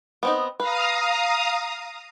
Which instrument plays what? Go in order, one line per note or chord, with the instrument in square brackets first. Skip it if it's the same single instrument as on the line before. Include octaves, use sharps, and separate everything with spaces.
[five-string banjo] B3 C4 D#4
[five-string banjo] B4 [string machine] F5 A#5 D#6